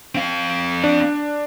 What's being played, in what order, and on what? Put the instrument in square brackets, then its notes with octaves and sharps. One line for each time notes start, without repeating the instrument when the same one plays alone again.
[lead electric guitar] C4 F5
[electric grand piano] D4